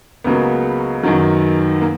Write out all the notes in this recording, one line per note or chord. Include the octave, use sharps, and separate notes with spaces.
C#2 C#3 F#3 A#3 B3
F#2 D#3 F#3
A#3